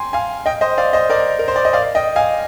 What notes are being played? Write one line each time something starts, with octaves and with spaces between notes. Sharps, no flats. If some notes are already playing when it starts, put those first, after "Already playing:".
Already playing: G5 G#5 A#5 C6
F5 G#5
D#5 G5
C5 D#5
D5 F5
C5 D#5
A#4 D5
A#4
C5
D5
D#5
D5 F5
D#5 G5
F5 G#5